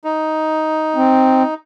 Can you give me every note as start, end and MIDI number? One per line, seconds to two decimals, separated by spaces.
0.04 1.54 63
0.96 1.43 60